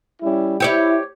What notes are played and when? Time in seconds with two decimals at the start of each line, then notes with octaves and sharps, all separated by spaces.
0.22 G3 C#4 E4
0.60 E4 G4 C#5 D5